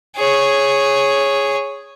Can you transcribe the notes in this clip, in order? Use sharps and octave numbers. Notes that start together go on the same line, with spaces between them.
G#4 C#5